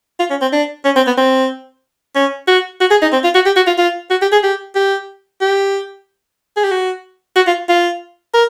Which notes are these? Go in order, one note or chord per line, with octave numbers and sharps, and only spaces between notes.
F4
C#4
C4
D4
C#4
C4
B3
C4
C#4
F#4
F#4
G#4
D#4
C4
F4
F#4
G4
F#4
F4
F4
F#4
G4
G#4
G4
G4
G4
G#4
G4
F#4
F#4
F4
F4
A#4